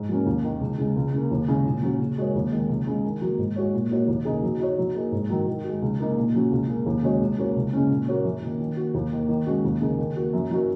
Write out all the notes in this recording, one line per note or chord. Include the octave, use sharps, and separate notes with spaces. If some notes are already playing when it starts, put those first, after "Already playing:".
Already playing: G#2
F#3 A#3 C#4
D#2
D#3 A#3
C#2
C#3 G#3
C#2
C#3 A#3
D#2
C#3 G#3
A#2
F#3 C#4 F#4
C#3
G#3 F#4 A#4 C#5
D#2
D#3 G#3
C#2
C#3 G#3
D#3
F#3 A#3 F#4
G#2
G#3 F#4 C#5
A#2
A#3 D#4 F#4 C#5
D#2
C#3 A#3 D#4 G#4
F#3
D#4 F#4 C#5
F#3
A#3 D#4 G#4
G#2
D#3 F#3
D#3
G#3 F#4
C#2
C#3 A#3 D#4
A#2
F#3 C#4 F#4
C#2
C#3 A#3
D#2
C#3 G#3 F#4 C#5
C#2
C#3 A#3 F#4 C#5
C#2
C#3 G#3 C#4
A#2
A#3 F#4 C#5
F#2
D#3 A#3
D#3
A#3 F#4
D#2
D#3 A#3
D#3
G#3 C#4 F#4
D#2
C#3 A#3 D#4 G#4
D#3
A#3 F#4 A#4
F#2
F#3 D#4 F#4 A#4